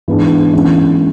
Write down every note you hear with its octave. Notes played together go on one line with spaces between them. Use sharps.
G#2 E3 G#3 B3 D4
F#1 F#2 E3 G#3